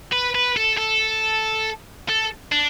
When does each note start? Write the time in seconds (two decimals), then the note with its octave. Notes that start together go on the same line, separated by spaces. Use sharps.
0.12 B4
0.35 B4
0.57 A4
0.78 A4
2.08 A4
2.52 D4